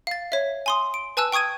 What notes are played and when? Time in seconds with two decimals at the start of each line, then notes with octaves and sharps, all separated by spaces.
0.07 F5 A6
0.32 C#5 E5
0.66 G#5 C6 D#6
0.94 D7
1.17 B4 G#5 A5 E6 F#6
1.32 G5 C#6 D#6 G#6 D#7